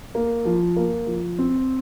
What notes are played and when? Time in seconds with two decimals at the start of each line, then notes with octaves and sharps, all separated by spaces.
0.15 A#3
0.45 F3
0.76 A#3
1.07 F3
1.39 C4